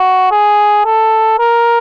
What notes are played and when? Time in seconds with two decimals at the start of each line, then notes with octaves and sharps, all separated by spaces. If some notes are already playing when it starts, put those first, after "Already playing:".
Already playing: F#4
0.31 G#4
0.86 A4
1.39 A#4